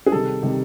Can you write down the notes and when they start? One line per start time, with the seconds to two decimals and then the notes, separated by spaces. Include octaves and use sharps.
0.06 G#4
0.12 C3 D#3 G3 A4
0.43 C3 D#3 G3